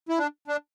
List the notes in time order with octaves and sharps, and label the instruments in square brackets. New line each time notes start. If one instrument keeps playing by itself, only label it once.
[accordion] E4
D4
D4